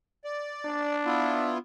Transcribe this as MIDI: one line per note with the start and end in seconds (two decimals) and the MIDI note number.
0.24 0.96 74
0.65 1.54 62
1.05 1.58 59
1.05 1.58 64
1.05 1.58 65